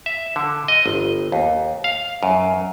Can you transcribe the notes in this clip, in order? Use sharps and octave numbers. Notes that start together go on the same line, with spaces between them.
E5
D3
D#5
G1
D#2
F5
F#2